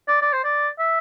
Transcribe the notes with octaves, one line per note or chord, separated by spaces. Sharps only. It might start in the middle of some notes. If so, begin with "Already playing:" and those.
D5
D5
C5
D5
E5